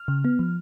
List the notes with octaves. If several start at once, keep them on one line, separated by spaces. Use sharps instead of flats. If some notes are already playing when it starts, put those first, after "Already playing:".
Already playing: F6
C#3
B3
F3